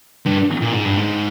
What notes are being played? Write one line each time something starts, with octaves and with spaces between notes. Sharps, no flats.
G2
A#2
G#2
G2
G#2